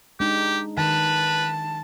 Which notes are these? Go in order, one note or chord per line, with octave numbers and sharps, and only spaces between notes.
G#3 D4 D#4 G4
D#3 B4 A5